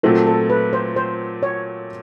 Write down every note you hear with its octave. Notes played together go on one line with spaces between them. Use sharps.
A#2 F#3 A3 C4 A4
A4
B4
C5
C5
C#5